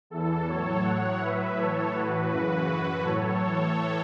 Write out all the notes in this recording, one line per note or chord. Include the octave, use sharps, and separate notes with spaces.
E2 E3 A4
A2 F#3 A4 C#5
A2 F#3 C#5 F#5
A2 F#3 B4 E5
A2 E3 A4 C#5
A2 E3 F#4 B4
F#2 C#3 E3 F#4 B4
F#2 E3 F#4 B4
A2 F#3 A4 C#5
A2 E3